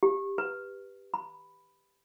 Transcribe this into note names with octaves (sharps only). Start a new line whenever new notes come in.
G4
B4
B5